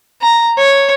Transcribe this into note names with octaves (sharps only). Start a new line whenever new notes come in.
A#5
C#5